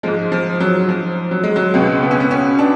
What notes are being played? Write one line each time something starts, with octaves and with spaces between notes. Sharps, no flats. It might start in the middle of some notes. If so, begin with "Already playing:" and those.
G#2 F3 G#3
F3
F#3
F3
F#3
G#3
F#3
C#2 B2 G#3
B3
C#4
B3
C#4
D4